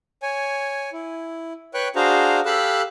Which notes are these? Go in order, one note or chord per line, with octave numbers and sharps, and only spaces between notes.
C#5 G#5
E4
B4 C#5 G5 C#6 F#6
D4 F#4 G#4 C5 F5 A#5
G4 A4 F5 B5 E6 F#6